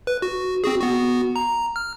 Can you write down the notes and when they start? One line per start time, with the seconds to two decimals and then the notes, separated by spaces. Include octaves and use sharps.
0.07 B4
0.22 F#4
0.64 C4 F#4 G#4
0.81 B3 F#4
1.36 A#5
1.76 F6